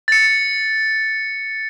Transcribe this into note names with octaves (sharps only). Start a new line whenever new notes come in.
A6 C#7